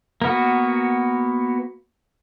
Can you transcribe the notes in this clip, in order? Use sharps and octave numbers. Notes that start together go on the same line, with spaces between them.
A#3 B3 F#4